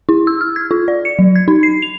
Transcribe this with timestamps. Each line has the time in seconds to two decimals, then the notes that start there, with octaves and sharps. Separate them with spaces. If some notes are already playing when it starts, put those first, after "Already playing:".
0.09 E4
0.27 E6
0.41 F6
0.56 G#6
0.71 F4
0.88 D5
1.05 C#7
1.19 F#3
1.36 G#6
1.48 D#4
1.63 C7
1.82 F7